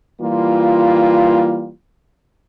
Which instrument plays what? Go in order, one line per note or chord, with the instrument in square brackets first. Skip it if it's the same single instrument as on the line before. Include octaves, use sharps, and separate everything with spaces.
[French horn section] E3 G3 A#3 F4